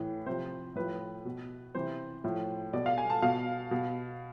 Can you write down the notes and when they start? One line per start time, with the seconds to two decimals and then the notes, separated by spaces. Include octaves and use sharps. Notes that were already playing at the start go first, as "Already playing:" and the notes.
Already playing: A2 E3
0.26 C3 F3 C5
0.75 A2 F3 B4
1.25 B2
1.75 C3 E3 C5
2.24 A2 F3
2.73 B2 D5
2.86 F5
2.98 G#5
3.10 A5
3.22 B2 F5
3.71 B2